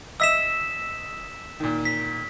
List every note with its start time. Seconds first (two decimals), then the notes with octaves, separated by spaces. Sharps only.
0.20 D#5 E5 E6 B6 E7
1.60 A#2 D#3
1.85 B6